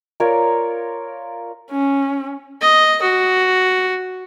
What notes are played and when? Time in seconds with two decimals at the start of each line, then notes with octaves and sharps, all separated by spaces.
0.20 F4 A#4 C#5 D5
1.71 C#4
2.61 D#5
3.02 F#4